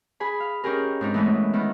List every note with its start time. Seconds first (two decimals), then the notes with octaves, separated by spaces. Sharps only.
0.20 G#4 G#5 B5
0.40 F5
0.64 C#4 D#4 G4 G#4 A#4
1.01 G#2 C4 D#4
1.14 E3 G#3 A3 B3 C#4
1.53 D#3 B3 E4